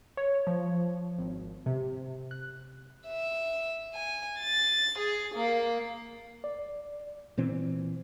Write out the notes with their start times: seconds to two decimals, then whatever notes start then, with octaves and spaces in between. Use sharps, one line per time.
0.17 C#5
0.47 F3
1.19 G#1
1.66 C3
2.31 F#6
3.08 E5
3.95 G#5
4.39 A6
4.98 G#4
5.35 A#3
6.44 D5
7.37 A#2 E3 C4